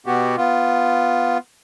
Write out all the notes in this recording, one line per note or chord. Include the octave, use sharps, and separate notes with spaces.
B2 B3 F#4 G4
B3 F4